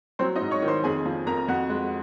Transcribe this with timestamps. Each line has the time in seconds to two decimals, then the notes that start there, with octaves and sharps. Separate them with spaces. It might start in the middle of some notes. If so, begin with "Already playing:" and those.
0.19 F#3 C4 C5
0.36 D#4 D#5
0.41 G#2
0.51 C#5 C#6
0.62 D#3
0.68 C5 C6
0.84 F2 G#4 G#5
1.05 F3
1.27 F2 A#4 A#5
1.48 F2 F#4 F#5
1.70 G#3